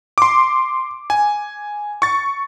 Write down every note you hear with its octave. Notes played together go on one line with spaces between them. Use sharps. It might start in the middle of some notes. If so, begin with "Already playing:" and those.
C6 D6
G#5
C#6 A6